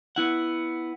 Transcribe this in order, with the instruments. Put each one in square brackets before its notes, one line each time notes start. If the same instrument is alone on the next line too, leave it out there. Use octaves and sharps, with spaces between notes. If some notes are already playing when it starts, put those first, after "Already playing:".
[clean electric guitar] B3 E4 F#5